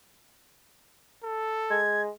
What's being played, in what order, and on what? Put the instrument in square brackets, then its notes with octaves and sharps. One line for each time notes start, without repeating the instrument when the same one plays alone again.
[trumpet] A4
[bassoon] G#3 [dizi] G#6